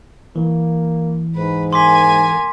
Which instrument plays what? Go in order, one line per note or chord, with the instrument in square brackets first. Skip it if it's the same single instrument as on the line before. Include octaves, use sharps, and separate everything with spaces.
[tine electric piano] E3 [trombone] A#3
[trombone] G#2 [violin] B4
[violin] A#3 G#5 [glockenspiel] C6 D6 B6